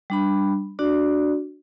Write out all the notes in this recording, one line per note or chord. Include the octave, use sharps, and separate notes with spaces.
G3 D4 B5
D4 F#4 D5